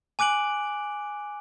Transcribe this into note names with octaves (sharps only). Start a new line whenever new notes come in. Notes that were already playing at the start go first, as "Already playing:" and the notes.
G#5 D6 F#6 D7 F#7